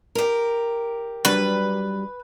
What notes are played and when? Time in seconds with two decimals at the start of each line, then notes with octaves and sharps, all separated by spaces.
0.15 G4 A#4
1.25 F#3 G3 D4 B4